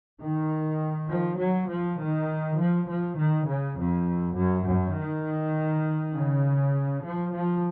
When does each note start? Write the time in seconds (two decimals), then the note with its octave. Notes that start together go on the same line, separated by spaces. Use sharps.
0.20 D#3
1.09 F3
1.39 F#3
1.69 F3
1.99 D#3
2.58 F3
2.87 F3
3.18 D#3
3.47 C#3
3.78 F2
4.36 F#2
4.67 F#2
4.95 D#3
6.15 C#3
7.05 F3
7.34 F3